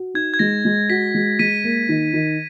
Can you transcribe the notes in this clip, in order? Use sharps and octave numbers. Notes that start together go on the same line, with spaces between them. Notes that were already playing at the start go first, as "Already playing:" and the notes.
Already playing: F#4
D#4 G#6
G#6
G#3 A#6
G#3
F#4 B6
G#3
G#3 B6 D#7
A#3
D#3
D#3